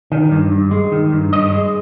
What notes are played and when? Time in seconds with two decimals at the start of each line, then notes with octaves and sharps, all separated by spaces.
0.12 D#3
0.32 G2
0.51 G2
0.71 G#3
0.92 D#3
1.12 G2
1.32 G2 D#5
1.53 G#3